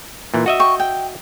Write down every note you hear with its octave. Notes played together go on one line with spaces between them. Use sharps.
A#2 E3
F#4 D#5 E5
G5 C#6
G5